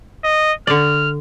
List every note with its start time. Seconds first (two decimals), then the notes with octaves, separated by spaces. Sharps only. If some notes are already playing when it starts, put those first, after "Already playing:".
0.24 D#5
0.67 D3 D5 F6